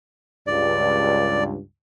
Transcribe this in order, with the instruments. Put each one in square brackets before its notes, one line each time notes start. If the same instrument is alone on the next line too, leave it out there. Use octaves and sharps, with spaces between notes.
[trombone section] C#2 G2 [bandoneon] D5